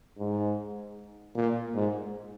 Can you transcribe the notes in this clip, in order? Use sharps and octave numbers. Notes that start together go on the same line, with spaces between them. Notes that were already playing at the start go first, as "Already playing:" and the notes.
G#2
A#2
G#2